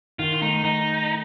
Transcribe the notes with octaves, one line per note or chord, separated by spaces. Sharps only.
D#3 F4
A3 D#4
D#4